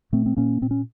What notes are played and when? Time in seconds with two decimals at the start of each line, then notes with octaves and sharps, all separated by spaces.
0.12 A#2 A3 C4
0.26 C4
0.37 A#2 A#3 C#4
0.62 A#2 C4
0.71 C#4